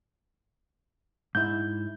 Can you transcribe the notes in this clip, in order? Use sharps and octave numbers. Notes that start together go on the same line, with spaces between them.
G#2 E4 G6